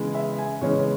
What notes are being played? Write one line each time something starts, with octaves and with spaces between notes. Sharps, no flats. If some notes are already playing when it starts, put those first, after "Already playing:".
Already playing: C#3 E3 G#3 B3
E5
G#5
C#3 E3 G#3 B3 C#5